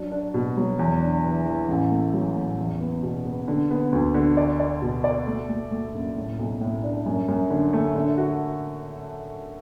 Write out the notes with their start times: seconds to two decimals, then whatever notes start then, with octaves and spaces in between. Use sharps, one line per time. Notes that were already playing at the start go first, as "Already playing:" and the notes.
Already playing: F#3 D4
0.12 D4
0.34 B2
0.57 F#3
0.79 E2
1.01 D4
1.24 E3
1.46 E3
1.69 A1
1.91 A3
2.14 F#3
2.36 A2
2.58 E2
2.81 B3
3.03 B2
3.25 B3
3.48 D3
3.71 B3
3.92 D2
4.14 D3
4.37 D5
4.60 D5
4.82 B2
5.04 D5
5.27 A3
5.49 A3
5.72 A3
5.94 F#1
6.16 A2
6.39 B1
6.61 A2
6.84 D4
7.06 F#2
7.28 F#2
7.50 D3
7.73 A3
7.95 D3
8.18 F#4